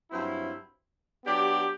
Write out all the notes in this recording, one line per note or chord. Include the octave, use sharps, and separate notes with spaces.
G2 F#3 C4 E4
F#3 B3 D4 G4